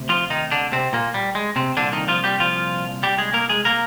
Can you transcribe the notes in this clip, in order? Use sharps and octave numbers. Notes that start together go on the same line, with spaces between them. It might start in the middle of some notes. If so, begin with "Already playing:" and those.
Already playing: D2 C3
F3 F4
D#3 D#4
D3 D4
C3 C4
A#2 A#3
G3
G#3
C3 C4
C2 A#2 D3 D4
D#3 D#4
F3 F4
G3 G4
F3 F4
G3 G4
G#3 G#4
A#3 A#4
G#3 G#4
A#3 A#4